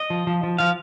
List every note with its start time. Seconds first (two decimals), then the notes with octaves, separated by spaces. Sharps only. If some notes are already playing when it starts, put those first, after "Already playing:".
Already playing: D#5
0.10 F3
0.27 F3
0.43 F3
0.58 F3 F5